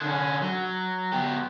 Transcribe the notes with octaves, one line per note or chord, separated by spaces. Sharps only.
D3 C#4
F#3
B3 G4